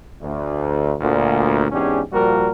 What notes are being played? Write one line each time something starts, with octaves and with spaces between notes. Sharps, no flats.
D2
D2 A#2
E2 G#2 C#4 D4 G4 G#4
A#2 F3 G3 F#4 A#4